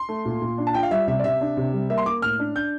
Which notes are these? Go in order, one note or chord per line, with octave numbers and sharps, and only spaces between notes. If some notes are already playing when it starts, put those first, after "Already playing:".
Already playing: C6
A3
A#2
A#2
D4
A5
F4 G5
F5
G3 E5
C3 E5
D5
C3 E5
D4
C3
G3
A#3 E5
C6
A#3 D6
A2 F6
D4
D4 G6